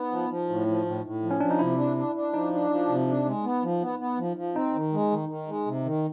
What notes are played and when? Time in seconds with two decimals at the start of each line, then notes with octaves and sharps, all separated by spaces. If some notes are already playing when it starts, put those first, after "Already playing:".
Already playing: B3 D#4
0.11 F3
0.30 F3
0.49 A2
0.68 F3
0.85 A2
1.04 A2
1.22 F3
1.31 C#4
1.40 F3 D4
1.51 D#4
1.59 C3 E4
1.78 D4
1.97 D4
2.16 D4
2.33 F3 D#4
2.53 D4
2.70 F3
2.89 C3
3.08 D4
3.25 G#3
3.44 B3
3.63 F3
3.82 B3
3.99 B3
4.19 F3
4.37 F3
4.55 C4 D#4
4.74 D#3
4.93 G#3
5.11 D#3
5.29 D#3
5.48 G#3
5.66 C3
5.85 D#3